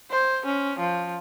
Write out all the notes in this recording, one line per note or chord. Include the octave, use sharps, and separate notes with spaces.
C5
C#4
F3